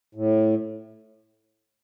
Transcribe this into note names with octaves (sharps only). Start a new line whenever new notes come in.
A2